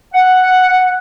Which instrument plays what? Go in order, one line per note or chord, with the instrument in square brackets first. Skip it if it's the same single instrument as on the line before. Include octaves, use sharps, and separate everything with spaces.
[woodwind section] F#5